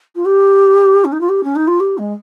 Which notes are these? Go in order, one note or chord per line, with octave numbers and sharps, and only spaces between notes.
F4
G4
C#4
D#4
F4
G4
C#4
D#4
F4
G4
G#3